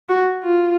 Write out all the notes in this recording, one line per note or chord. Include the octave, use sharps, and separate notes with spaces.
F#4
F4